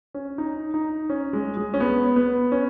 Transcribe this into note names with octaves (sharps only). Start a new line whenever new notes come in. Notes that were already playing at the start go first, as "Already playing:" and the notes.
C#4
D#4
D#4
C#4
G#3
G#3
C#4
B3
B3
C#4